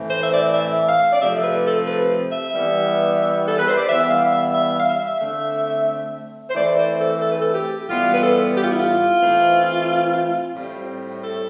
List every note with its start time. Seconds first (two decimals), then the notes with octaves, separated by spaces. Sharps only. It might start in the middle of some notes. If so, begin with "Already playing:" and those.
Already playing: A2 E3 A3 C4
0.09 C5
0.22 E5
0.32 D5
0.53 E5
0.87 F5
1.12 D5
1.20 C3 F3 A3 C4 E5
1.36 A4
1.42 B4
1.65 A4
1.87 B4
2.32 E5
2.54 E3 G3 B3
3.47 A4
3.57 B4
3.68 C5
3.77 D5
3.87 E3 G3 B3 E5
4.10 F5
4.32 E5
4.54 E5
4.78 F5
4.87 E5
5.21 D3 A3 C4
6.50 C5
6.54 E3 A3 C4 D5
6.77 C5
6.99 A4
7.21 A4
7.30 B4
7.40 A4
7.54 G4
7.87 A2 E3 G3 B3 F4
8.14 B4
8.21 A4
8.55 G4
8.61 F4
8.69 E4
8.76 F4
9.21 E3 A3 C4
10.55 A2 G3 C4
11.21 A4